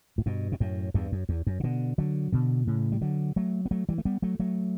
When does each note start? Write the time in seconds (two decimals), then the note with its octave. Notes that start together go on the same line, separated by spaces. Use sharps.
0.18 A2
0.26 G2 B2
0.52 B2
0.60 F#2 A2
0.94 E2 G2
1.12 F#2
1.29 E2
1.47 F#2
1.60 C#3
1.64 B2 D3
1.98 D3 F#3
2.32 B2 D3
2.67 A2 C#3
2.92 G3
3.01 D3 F#3
3.36 F#3 A3
3.66 B3
3.71 F#3 A3
3.89 E3 G3
3.98 A3
4.05 G3 B3
4.22 F#3 A3
4.40 F#3 A3